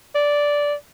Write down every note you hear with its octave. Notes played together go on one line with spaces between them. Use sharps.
D5